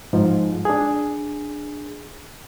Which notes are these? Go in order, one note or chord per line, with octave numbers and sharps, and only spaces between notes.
G#2 F3
D4 G#4